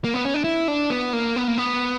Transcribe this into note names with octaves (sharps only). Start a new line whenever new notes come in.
A#3
B3
C#4
D4
E4
D4
B3
A#3
B3
A#3
B3